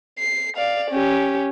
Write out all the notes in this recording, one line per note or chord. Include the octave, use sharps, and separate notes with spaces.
C7
D5 F5
C#4 G4